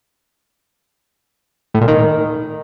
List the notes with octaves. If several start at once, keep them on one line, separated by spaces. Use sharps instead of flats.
A2
A#2
D#3